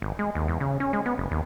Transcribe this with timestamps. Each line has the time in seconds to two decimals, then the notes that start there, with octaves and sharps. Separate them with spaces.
0.02 G#1
0.19 G#3
0.35 D#2
0.48 E2
0.60 C#3
0.80 C#4
0.93 G#3
1.06 B3
1.18 F#1
1.31 D#2